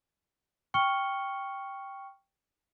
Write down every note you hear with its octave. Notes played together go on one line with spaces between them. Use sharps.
G5 C#6 F6 C#7 G7